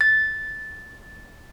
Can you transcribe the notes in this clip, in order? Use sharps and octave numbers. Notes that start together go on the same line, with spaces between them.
A6